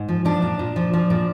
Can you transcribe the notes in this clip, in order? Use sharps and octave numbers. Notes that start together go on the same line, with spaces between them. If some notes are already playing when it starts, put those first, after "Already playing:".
Already playing: G#2
F3
F3 D4
A#2
A#2
F3
F3
A#2